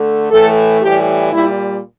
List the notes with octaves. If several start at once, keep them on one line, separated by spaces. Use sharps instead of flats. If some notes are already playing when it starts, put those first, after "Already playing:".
Already playing: D3 A3
A2 E3 A3 A4
A2 E3 G3 G4
A#2 G3 E4